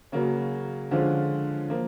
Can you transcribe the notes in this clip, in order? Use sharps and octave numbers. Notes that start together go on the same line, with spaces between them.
C#3 F#3 A#3 C#4
D3 F3 G#3 C#4 F4
F3 A#3